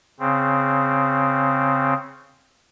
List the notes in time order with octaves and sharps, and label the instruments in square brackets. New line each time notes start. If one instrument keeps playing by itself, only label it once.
[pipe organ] C#3 C4